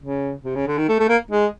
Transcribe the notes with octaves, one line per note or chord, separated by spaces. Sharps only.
C#3
C3
C#3
D3
D#3
A3
A3
A#3
G#3